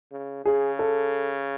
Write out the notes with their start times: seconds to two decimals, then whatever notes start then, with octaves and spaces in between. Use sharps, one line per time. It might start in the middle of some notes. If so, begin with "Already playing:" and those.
0.12 C#3
0.45 C#3 G#4
0.79 A4